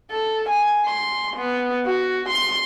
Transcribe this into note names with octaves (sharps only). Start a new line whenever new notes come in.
A4
G#5
C6
B3
F#4
C6